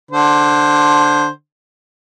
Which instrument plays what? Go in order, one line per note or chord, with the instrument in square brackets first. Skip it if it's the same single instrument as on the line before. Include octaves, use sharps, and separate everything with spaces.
[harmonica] D3 C5